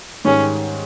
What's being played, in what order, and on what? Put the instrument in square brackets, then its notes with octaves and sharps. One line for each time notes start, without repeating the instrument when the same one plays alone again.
[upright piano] G#2 D#3 G3 [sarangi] C#4